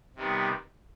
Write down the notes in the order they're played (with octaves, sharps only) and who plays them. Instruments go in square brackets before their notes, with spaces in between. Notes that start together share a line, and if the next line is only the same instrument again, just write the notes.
[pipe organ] C3 D#3 G3 B3